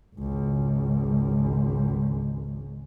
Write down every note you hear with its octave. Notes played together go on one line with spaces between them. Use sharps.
G#1 C#2